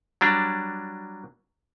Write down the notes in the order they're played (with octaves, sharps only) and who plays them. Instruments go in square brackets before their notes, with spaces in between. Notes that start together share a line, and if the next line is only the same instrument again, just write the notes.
[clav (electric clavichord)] F#3 G3 D4